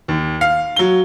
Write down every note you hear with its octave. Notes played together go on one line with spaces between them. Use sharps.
D#2
F5
F#3 G7